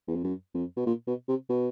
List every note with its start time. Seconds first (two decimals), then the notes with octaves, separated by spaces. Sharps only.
0.08 E2
0.16 F2
0.24 F#2
0.54 F2
0.77 B2
0.86 A#2
1.07 B2
1.28 C3
1.49 B2